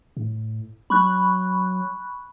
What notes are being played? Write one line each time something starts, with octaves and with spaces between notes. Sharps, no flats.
A2
F#3 B5 C#6 F#6